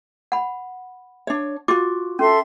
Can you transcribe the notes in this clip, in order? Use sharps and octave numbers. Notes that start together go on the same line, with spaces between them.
F#5 B5
D4 C#5
F4 F#4 D6
C#4 A4 E5 C6